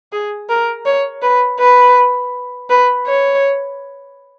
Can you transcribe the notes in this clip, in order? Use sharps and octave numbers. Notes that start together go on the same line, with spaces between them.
G#4
A#4
C#5
B4
B4
B4
C#5